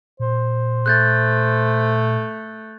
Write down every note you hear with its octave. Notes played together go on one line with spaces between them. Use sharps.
A#2 C5
A3 F#6 G6 A6